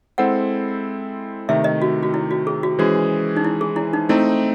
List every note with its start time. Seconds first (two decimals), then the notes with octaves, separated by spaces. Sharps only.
0.18 G#3 C4 E4 A4 C5 F#5
1.49 C3 D#3 A3 E5
1.64 D#5
1.82 F#4
2.03 F#4
2.14 E4
2.31 F#4
2.47 G#4
2.63 F#4
2.79 E3 G#3 C#4 F#4 G#4 C5
3.37 D#4
3.44 E4
3.61 G#4
3.76 E4
3.93 D#4
4.09 A3 C4 D#4 E4